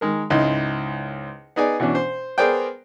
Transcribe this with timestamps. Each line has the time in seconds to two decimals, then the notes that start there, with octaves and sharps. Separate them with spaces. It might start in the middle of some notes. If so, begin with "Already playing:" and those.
0.01 D#3 G#3 A#4
0.30 C#2 G#2 E4 D#5 C6
1.56 B3 D#4 G#4 D5 G#5
1.80 B2 E3 C#4 D4
1.95 C5
2.38 B3 G#4 A#4 C5 D5 G5